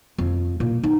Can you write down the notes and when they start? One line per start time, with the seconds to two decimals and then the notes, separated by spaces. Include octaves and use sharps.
0.18 F2
0.60 A#2
0.83 D#4